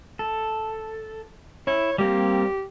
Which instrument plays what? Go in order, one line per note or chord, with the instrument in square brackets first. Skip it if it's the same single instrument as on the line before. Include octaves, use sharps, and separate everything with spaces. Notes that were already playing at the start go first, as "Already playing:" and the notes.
[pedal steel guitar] A4
[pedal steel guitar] E4 [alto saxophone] C#5
[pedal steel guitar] G3 A#3 C4 [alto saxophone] G4